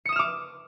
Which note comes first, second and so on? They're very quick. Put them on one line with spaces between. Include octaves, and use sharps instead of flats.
C#7 D#6 E7 F6 D6